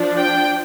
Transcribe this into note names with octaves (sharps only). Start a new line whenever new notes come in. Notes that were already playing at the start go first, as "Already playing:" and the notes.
Already playing: F3 D4
G5